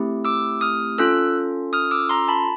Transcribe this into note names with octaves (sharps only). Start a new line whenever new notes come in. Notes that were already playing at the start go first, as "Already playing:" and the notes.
Already playing: A3 C4 E4 G4
D6 E6
D#6 F6
C#4 F4 A4 E6 F#6
D#6 F6
D6 E6
A#5 C6
A5 B5